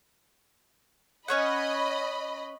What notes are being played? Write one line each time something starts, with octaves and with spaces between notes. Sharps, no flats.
C#4 C#5 D#5 F#5 B5